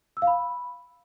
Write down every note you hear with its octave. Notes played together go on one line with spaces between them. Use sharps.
E6
F5
B5